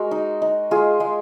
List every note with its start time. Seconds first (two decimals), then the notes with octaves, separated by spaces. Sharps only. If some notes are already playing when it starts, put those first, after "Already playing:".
Already playing: G#3 F#4 A#4
0.11 D#4
0.42 D#4
0.71 G#3 F4 G#4
1.00 G#3